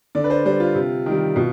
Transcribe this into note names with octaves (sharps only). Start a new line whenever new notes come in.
D3 D5
B4
C5
G3 C5
F4
C3
D#3 G3
B2 F4